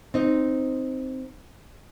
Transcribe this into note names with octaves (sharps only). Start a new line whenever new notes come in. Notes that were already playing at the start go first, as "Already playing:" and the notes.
C4 D#4